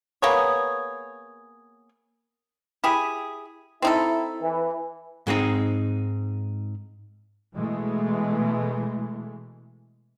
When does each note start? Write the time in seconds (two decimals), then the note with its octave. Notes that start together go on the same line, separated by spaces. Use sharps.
0.22 A#3 B3 G#4 C#5
2.84 E4 G4 G#4
3.82 C4 D#4 E4 A4
4.42 E3
5.27 G#2 G#3 C4 D#4
7.54 B2 E3 G#3 A3